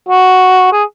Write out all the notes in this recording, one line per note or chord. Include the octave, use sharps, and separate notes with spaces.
F#4
G#4